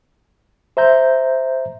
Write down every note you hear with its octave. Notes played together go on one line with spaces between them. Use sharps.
C5 E5 A#5 G6